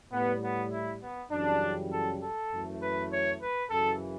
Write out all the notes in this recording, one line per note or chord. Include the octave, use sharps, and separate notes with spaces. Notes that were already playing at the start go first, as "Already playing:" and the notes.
A2 G3 B3
B3
E4
B3
F#2 C#3 E3 G3 D4
A4
A4
F#2 E3 A3
B4
C#5
B4
F#2 C#3 E3 A4